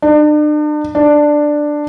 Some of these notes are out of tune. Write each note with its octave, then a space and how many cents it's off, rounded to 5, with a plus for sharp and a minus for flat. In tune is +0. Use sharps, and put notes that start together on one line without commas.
D4 +40
D4 +10